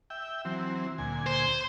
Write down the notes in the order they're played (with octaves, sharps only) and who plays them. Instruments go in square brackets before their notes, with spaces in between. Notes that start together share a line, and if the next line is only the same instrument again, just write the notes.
[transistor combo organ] E5 G5
E3 F#3 C4
D2 A#2 G#5
[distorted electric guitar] C5